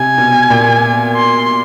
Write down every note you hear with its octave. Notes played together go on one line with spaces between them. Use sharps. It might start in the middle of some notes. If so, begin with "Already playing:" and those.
Already playing: C3 G#5
B2
A#2
C6